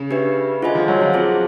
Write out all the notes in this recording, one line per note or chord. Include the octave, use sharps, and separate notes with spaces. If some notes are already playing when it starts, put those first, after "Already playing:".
Already playing: C#3
D4 G4 B4 E5
D3 F4 G#4 C5 D#5 G#5
F3
F#3
F3
C4 F4 G#4 C5